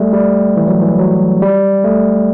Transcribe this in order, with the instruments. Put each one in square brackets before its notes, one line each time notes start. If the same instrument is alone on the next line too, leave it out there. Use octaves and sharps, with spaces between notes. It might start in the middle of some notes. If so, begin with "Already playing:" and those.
Already playing: [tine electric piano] G3 A3
G3
E3
F#3
E3
F#3
G3
A3